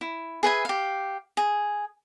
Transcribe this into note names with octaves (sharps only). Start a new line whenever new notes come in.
E4
G#4 B4 E5 G#5
G4 F5
G#4